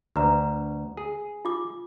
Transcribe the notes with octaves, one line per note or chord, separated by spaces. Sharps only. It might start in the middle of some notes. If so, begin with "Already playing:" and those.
D2 B4 A#5
G#4
F4 D6